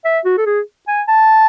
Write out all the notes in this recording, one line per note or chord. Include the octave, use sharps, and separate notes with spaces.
E5
F#4
A4
G#4
G#5
A5